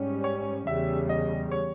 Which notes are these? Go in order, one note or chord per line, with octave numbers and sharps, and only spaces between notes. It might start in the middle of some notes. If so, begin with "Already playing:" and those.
Already playing: G#2 G3 C#4
C#5
E2 C#3 G3 E5
D#5
C#5